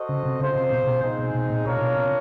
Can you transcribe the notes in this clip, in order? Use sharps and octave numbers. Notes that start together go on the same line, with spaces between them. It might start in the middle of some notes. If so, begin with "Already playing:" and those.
Already playing: F#4 A4 C5 D#5
C#3
C3
C#3 F4 G#4 C5
C3
B2
B2
G#3 C4 D#4 G#4
B2
B2
A#2
B2 D4 F4 A#4 C#5
B2
C3